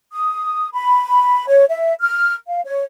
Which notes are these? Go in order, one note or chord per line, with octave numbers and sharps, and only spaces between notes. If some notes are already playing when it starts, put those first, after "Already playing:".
D#6
B5
C#5
E5
F6
F5
C#5